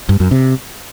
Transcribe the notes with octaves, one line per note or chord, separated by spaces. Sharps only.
G2
F#2
C3